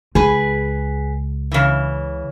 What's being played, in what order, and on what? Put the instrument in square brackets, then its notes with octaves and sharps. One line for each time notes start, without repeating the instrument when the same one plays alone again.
[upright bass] C#2 [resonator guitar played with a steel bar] G#4 B4
[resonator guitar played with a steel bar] C#3 E3